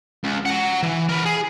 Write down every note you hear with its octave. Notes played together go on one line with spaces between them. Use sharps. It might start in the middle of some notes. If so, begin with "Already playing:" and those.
C#2
F#5 A#5
E3
A#4 B4
G#4